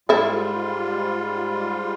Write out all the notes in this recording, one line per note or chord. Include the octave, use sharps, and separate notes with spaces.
G#2 G3 A3 E4 F4